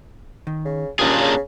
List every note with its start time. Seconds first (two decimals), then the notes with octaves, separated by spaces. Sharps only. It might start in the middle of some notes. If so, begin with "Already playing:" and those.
0.47 D#3
0.65 C#3
0.99 D#2 A#3 C#4 D4 F4 G4 G#4
1.20 C#3